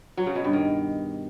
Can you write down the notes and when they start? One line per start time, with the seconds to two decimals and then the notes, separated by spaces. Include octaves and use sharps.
0.17 F#3
0.26 C#3
0.35 B2
0.44 G2
0.53 D#3